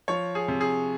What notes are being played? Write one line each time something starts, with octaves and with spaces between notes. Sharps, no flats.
F3 C#5
G#4
C3
G#4